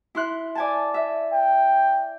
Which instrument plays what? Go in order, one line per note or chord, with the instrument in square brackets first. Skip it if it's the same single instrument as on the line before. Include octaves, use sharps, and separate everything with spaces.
[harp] E4 C6 F#6
D5 G#5 A5
E5
[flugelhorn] G5